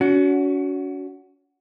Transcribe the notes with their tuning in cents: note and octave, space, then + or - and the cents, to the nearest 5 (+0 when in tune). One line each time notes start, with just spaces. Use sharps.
C#4 +35 F#4 +0